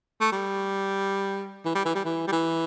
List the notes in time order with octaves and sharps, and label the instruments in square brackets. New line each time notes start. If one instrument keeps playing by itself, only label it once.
[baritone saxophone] A3
G3
E3
G3
E3
G3
E3
G3
E3